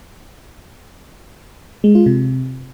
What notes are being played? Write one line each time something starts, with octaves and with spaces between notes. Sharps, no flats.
G#3
F4
C3